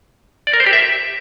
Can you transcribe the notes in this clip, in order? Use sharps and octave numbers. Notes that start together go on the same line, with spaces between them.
D5
A#4
C5
G4
E5